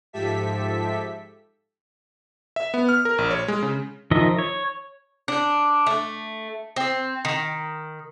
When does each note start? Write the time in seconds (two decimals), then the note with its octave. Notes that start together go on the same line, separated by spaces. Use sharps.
0.13 G#2 F3 G4 A4 E5 B6
2.56 E5
2.74 B3
2.89 F6
3.05 A#4
3.18 A#1
3.31 C#5
3.48 G#3
3.63 C#3
4.11 D#3 F3 D#5 E5
4.39 C#5
5.28 D4
5.87 A3
6.76 C4
7.25 D#3